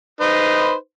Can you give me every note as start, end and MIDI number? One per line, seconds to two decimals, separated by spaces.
0.21 0.74 63
0.21 0.74 71
0.21 0.74 72